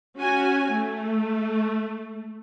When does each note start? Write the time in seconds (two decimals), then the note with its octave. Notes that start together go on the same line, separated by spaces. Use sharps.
0.16 C#4 F#4 G#5
0.72 A3